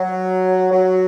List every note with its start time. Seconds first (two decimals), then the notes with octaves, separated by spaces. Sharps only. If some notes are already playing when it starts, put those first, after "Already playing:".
Already playing: F#3
0.72 F#3